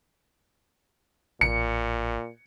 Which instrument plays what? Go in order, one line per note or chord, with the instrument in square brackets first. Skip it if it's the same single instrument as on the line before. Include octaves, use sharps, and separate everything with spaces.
[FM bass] A1 [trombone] A#2 [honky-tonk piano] C#7